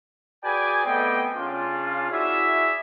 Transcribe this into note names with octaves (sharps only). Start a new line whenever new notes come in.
F#4 G#4 B4 D5 G5 G#5
A3 B3 C4 D5 D#5 G5
C#3 C#4 D4 F4
E4 F#4 G#4 D5 E5